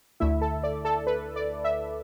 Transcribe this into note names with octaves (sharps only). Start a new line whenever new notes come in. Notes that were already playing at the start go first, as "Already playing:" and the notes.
D2 D3 A3 E4 E5
A4
D5
A4
B4
D5
E5